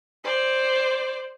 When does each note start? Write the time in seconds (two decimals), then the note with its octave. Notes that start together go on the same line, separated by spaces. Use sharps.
0.24 C5 D5